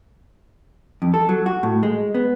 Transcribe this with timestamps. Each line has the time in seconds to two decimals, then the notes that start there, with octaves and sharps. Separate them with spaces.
1.02 F2
1.14 A4
1.29 F#3
1.46 F#4
1.63 A2
1.83 G#3
2.14 B3